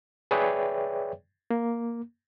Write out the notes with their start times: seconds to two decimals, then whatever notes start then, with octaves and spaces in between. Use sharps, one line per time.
0.31 G#4 B4 C#5 D5 E5 G5
1.51 A#3